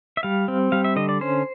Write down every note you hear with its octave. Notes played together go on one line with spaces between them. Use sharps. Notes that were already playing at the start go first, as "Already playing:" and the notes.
E5
G3 F5
C4
G3 F5
E5
D3 D#5
D5
C#4 C5